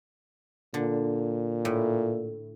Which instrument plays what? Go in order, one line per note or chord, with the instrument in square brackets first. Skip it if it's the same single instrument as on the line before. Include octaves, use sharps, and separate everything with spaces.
[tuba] A#2 [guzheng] D3
[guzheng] A2